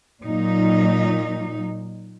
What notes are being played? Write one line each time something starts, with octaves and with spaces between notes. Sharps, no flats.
A#2 F#3 D#4